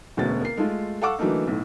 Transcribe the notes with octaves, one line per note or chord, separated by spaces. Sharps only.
E1 D2 B2 C#4 F#4 A6
A#3 C7
G#3 A3 F4
A4 F5 F#5 C#6 D6 E6
D3 E3 F#3 A3 A#3 D#4
B1 A2